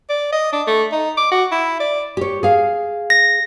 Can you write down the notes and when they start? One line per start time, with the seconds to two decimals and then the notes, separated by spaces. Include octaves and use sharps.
0.09 D5
0.32 D#5
0.52 D4
0.67 A3
0.92 D#4
1.17 D6
1.32 F#4
1.52 E4
1.80 D5
2.17 G4 C#5
2.43 G#4 F5
3.10 A#6